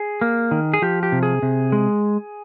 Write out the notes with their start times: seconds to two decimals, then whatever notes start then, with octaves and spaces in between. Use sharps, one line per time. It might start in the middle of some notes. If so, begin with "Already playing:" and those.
Already playing: G#4
0.21 A#3
0.51 D#3
0.74 G#4
0.82 F3 G4
1.03 G4
1.12 C3
1.23 G#4
1.42 C3
1.72 G#3